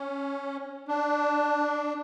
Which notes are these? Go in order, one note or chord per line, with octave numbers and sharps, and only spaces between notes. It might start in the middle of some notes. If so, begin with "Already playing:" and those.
Already playing: C#4
D4